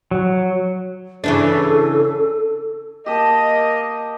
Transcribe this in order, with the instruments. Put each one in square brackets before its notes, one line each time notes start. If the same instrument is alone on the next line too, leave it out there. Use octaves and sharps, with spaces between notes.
[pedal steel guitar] F#3
[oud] C#3 E3 D4 [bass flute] A4
[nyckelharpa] A#3 [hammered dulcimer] G4 A5 [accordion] D#5